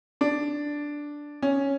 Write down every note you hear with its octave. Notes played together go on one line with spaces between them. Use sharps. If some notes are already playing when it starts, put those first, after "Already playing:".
D4
C#4